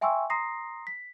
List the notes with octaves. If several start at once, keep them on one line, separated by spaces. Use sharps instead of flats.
E5 G5 G#5 C6 C#6 E6
A#5 C6 D#6 A#6 C7
B6